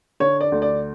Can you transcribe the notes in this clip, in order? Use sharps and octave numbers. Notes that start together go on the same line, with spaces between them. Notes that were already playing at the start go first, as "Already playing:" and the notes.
D3 C#5
D5
D2
D5